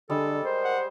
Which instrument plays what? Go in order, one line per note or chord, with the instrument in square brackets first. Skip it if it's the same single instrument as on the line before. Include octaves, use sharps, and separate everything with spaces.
[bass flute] D3 [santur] G3 G#3 D#5 [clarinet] A4
[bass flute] A#4 [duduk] C5
[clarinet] F#5